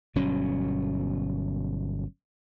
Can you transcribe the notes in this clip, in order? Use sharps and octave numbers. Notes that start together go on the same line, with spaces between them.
G1 B2 F#3 C#4